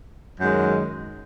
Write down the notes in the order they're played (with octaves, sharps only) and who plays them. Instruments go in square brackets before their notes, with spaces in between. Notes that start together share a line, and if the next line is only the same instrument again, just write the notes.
[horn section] F#2 D#3 G#3